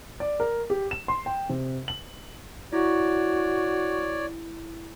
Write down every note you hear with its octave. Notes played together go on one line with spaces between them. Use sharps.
D5
A#4
G4
E7
C6
G5
C3
F#7
E4 F#4 C#5 D5